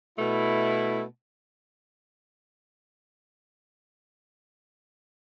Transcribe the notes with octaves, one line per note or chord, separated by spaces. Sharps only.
B2 A3 E4